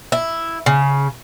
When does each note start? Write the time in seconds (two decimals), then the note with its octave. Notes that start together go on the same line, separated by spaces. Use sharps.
0.12 E4
0.66 C#3